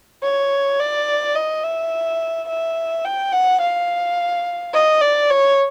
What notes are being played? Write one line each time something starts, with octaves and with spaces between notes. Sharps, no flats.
C#5
D5
D#5
E5
E5
G5
F#5
F5
D#5
D5
C#5